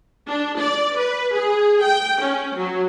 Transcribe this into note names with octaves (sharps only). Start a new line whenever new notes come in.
D4
D5
B4
G#4
G5
C#4
F#3